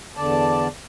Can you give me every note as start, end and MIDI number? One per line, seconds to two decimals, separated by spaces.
0.17 0.68 40
0.17 0.68 50
0.17 0.68 74
0.17 0.68 81